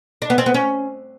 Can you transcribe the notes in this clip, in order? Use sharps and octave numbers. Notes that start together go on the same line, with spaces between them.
D4
B3
C4
B3
C#4